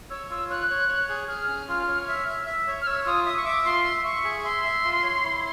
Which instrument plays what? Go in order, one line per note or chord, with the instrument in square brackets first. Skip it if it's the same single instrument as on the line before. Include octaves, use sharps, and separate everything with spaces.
[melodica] C#5 [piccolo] E6
[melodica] F4 [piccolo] E6
[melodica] C#5 [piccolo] F#6
[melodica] C#5
C#5
G#4
[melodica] G#4 [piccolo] F6
[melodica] C#4
F4
C#5
E5
E5
E5
C#5
[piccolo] F6
[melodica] C#5 [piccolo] E6
[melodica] F4 [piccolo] D#6
[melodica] E5 [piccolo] D#6
[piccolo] C#6
[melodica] E5 [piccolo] D6
[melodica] F4 [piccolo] C6
[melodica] E5
[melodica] E5 [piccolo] C#6
[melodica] G#4
[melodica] E5 [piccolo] C6
[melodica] E5
F4
C#5
E4